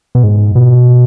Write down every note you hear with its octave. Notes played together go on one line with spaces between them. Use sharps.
B2
G#2
B2